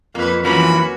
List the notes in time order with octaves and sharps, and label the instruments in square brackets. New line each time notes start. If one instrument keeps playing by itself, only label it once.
[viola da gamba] F2 B4 [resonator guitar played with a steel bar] A#3
[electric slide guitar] E3 F3 [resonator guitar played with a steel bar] A#3 C#4 B4 [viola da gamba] F#4 [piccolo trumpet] B5